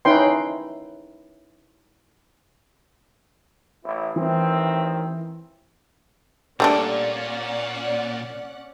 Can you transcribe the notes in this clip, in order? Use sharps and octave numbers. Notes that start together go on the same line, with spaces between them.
C#4 D#4 E4 B4 G5 C6
A1 E4
A1 D#3 E3 C4
A#2 G3 A3 C#4 D4 D5 F#5